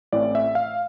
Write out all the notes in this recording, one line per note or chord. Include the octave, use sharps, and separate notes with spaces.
A1 A2 E3 A3 C4 D5
E5
F5